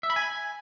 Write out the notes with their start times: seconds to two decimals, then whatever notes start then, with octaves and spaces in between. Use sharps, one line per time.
0.03 E5
0.10 B5
0.16 G#5